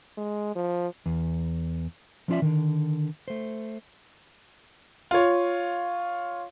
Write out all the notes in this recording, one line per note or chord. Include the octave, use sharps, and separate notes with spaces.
G#3
F3
E2
F3 A3 C#4 F4 D5 E5
D3 D#3
A3 C5
F4 C#5